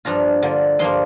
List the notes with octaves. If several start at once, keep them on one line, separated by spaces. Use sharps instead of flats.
G2 F3 D4 F4 A#5
D3 A#3 F4
G2 F3 A#3 C6